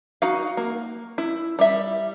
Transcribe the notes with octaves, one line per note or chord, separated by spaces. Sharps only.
D#4 F#4 F5
A#3
E4
G3 E5